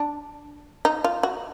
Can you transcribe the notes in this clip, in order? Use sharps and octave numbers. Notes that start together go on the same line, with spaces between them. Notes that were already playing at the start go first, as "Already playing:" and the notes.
Already playing: D4
D#4
F4
F#4